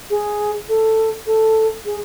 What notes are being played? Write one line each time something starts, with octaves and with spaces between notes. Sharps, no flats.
G#4
A4
A4
G#4